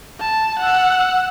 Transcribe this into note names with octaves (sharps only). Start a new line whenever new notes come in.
A5
F#5 E6